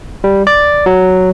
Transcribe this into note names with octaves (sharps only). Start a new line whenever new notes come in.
G3
D5
F#3